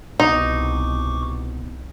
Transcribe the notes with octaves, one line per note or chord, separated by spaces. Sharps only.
C2 B2 B3 D#4 F#4 C#6 D6